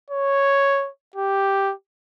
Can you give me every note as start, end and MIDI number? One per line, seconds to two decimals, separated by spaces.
0.10 0.89 73
1.16 1.73 67